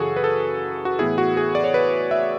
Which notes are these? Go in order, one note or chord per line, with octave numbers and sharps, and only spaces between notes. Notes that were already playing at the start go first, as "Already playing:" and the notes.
Already playing: F#2 C#3 E3 F#4 G#4 A4
B4
A4
F#4
A2 E3 B3 E4 G#4
F#4
G#4
D5
C#5
B4
E5